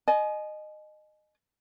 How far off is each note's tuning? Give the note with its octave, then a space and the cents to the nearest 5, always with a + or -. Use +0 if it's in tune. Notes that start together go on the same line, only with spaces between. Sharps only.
D#5 -20 G#5 +35